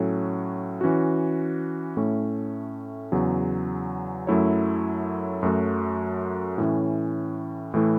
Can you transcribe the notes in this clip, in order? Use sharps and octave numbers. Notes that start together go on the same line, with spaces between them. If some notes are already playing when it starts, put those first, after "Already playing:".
Already playing: A2 F#3 C#4 A4
E3 C#4 F#4
A2 A3 C#4
E2 C#3 F#3
F#2 F#3 A3 E4 C#5
F#2 F#3 A3 F#4
A2 E3 C#4
A2 E3 A3 E4